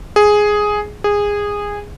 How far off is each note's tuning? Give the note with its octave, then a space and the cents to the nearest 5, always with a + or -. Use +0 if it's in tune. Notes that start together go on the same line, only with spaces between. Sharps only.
G#4 +5
G#4 -15